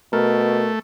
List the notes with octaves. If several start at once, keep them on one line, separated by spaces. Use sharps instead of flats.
B2 A3 A#4